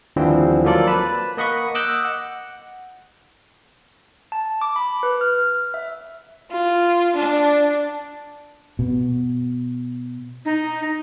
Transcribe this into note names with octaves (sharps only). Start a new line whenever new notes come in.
D#2 D3 E3 F3 G3 C4
F3 F#3 A#3 F4 A4 D5
B4 A5 B5
A#3 D#5 F#5 B5 C#6 D#6
D#5 D6 E6 F#6 G6
F#5
A5
D6
B5
B4
F6
E5
F4
D4
B2
D#4